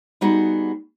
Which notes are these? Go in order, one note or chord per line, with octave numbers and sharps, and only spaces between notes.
G3 B3 D#4 F#4 G#4